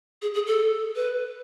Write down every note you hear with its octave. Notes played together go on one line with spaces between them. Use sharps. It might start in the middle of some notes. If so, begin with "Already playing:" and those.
G#4
G#4
A4
B4